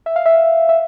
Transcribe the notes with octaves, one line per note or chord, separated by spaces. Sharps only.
E5
F5
E5
E5